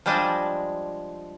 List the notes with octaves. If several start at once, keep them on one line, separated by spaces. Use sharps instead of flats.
F3 G3 G#3 D4 D#5